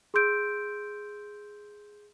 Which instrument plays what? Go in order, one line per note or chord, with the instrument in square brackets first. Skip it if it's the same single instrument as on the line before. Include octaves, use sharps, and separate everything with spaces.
[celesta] G#4 C6 E6 G6 D7